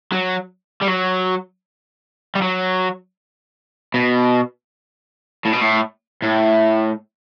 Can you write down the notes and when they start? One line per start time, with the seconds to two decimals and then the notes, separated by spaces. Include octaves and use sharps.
0.12 F#3
0.82 G3
0.88 F#3
2.35 G3
2.42 F#3
3.94 B2
5.45 A2
5.53 B2
5.62 A2
6.22 A2